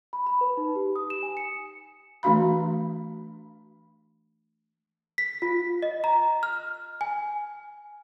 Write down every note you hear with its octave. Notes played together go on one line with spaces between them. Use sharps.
B5
B5
B4
D#4
G4
D#6
E7
G#5
C#7
E3 A3 D4 F#4 F5 B5
B6
F4
D#5
A#5
F6
G#5